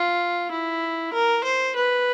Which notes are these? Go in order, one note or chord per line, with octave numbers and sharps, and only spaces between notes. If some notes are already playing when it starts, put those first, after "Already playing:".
Already playing: F4
E4
A#4
C5
B4